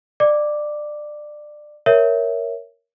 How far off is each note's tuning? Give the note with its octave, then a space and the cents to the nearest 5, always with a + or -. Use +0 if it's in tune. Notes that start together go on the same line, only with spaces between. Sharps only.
D5 +25 D6 +0
A#4 +5 C#5 +0 E5 +0